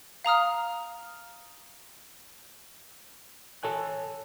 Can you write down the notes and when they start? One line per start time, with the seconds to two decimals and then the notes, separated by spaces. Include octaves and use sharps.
0.25 F5 A#5 D#6 F6
3.63 A4 C#5 G#5 F#6